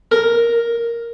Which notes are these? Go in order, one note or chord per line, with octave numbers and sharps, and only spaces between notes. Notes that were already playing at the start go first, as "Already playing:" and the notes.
A#4